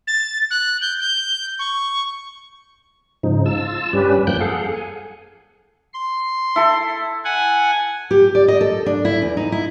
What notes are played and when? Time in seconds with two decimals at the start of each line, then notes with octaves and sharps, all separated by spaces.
0.07 A6
0.51 F#6
0.81 G6
1.00 G6
1.59 C#6
3.23 G#2 C#3 F3 D#4
3.46 F4 A5 E6
3.93 G2 G3 C#4 G4 B4
4.27 F#2 F3 A#3 G5 F#6 G6
4.41 G#4 A4 F5 F#5
4.72 G#5
5.94 C6
6.56 E4 A4
7.24 F#5 G#5
8.11 G4
8.35 D5
8.48 D#5
8.61 A4
8.86 D4
9.05 E4
9.22 E2
9.37 D#4
9.52 E4